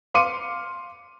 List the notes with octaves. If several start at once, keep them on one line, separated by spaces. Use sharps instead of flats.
F5 C6 D6 C#7 D#7